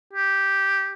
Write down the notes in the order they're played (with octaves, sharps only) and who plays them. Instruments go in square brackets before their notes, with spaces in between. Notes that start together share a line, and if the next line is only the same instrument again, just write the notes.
[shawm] G4